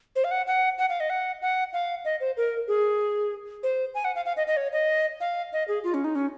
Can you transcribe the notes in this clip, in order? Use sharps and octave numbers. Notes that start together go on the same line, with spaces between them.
C5
F5
F#5
F#5
F#5
F5
D#5
F#5
F#5
F5
D#5
C5
A#4
G#4
C5
G#5
F#5
F5
F5
D#5
D#5
C#5
D#5
F5
D#5
G#4
F4
C#4
D#4
C#4